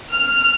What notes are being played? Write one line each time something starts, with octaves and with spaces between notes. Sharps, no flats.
F6